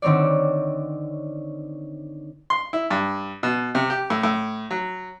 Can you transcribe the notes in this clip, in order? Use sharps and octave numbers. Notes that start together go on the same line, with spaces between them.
D3 D#3 C4 C#5 D5
C6
E4
G2
B2
C3
G4
A2
A2
F#3